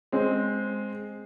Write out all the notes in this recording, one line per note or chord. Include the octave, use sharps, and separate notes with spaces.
G#3 C4